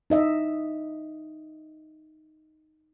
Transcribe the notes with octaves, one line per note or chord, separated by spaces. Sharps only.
D#4 D#5 E5